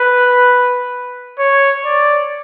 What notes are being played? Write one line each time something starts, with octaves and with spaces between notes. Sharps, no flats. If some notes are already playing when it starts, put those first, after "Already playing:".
Already playing: B4
C#5
D5